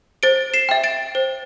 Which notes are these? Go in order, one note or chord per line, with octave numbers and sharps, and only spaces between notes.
C5 A6 D7
C7 E7
E5 G5
A6 D7
C5